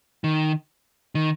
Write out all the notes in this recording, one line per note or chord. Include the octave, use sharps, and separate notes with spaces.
D#3
D#3